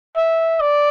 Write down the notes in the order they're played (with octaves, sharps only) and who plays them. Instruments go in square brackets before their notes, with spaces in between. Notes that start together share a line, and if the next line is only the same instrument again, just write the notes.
[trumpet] E5
D5